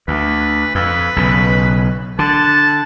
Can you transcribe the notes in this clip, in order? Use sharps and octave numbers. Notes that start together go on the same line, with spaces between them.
D2 B4
F2 B4
B1 C#3
D3 A5